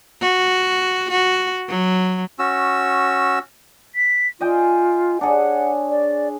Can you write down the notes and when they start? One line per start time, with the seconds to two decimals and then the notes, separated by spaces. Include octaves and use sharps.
0.22 F#4
1.11 F#4
1.69 F#3
2.39 C#4 F#4 E6
3.95 B6
4.41 F4 D#5 G5 G#5
5.21 D4 G#4 C#5 F#5
5.90 D5